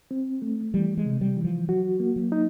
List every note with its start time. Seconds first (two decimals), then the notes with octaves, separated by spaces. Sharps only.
0.11 C4
0.42 A3
0.74 E3 G3
0.98 G#3
1.05 C3
1.21 G3
1.37 E3
1.44 F3
1.68 F#3 F#4
2.00 A#3
2.16 F#3
2.32 D#4